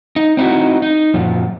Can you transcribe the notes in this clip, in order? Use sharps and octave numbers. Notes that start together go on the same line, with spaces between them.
D#4
C4 D#4 E4 F#4
D#4
F#2 A#2 F3